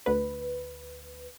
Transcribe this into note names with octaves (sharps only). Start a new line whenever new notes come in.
D2 B4